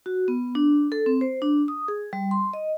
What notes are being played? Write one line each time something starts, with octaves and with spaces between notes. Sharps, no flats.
F#4
B3
D4
A4
C4
C5
D4
D#6
G#4
G3
C6
D#5